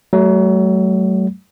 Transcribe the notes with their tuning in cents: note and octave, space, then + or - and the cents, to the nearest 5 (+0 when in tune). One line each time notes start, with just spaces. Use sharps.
F#3 +30 A3 -20